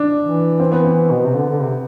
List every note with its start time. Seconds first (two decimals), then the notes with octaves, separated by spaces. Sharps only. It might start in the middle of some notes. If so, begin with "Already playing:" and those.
Already playing: D4
0.22 E3
0.60 C4
0.72 B3
0.85 C4
1.10 B2
1.24 C3
1.36 D3
1.49 D3
1.62 C3